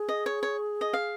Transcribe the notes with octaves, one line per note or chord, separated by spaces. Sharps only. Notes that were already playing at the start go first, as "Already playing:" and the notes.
Already playing: G#4
D#5
C#5
C#5
D#5
F5